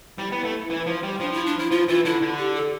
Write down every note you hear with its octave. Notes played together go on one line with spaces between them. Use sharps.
G3 E4
B3
A3
E3
F3
G3
F3 D4
E4
D4
E4
F3 F4
E3 F4
D3 E4
D3
G4
A4